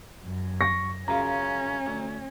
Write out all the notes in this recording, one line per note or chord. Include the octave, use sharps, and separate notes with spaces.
F#2
C#6 A#6
F#2 C#3 C#4 F4 A#5
D2